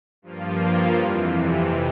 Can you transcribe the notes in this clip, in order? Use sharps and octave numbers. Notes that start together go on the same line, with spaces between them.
G2 F3 A#3 F4
F2 C3 E3